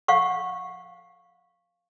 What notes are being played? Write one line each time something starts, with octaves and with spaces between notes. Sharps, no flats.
F5 F#5 C#6